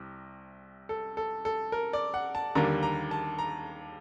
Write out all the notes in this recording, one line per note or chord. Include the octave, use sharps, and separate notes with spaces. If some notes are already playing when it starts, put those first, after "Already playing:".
Already playing: C2 C3
A4
A4
A4
A#4
D5
F#5
A5
D#2 D3 G3 A#3 A#5
A#5
A5
A#5